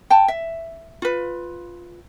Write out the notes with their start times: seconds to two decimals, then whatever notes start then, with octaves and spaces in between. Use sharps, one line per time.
0.10 G5 A5
0.28 E5
1.02 F4 B4